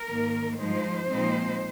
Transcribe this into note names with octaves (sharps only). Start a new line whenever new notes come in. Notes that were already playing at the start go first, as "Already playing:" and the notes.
Already playing: A#4
G#2 D#3 A#3
G2 F3 G#3 D#4 C5
A#2 F3 G#3 C4 D#4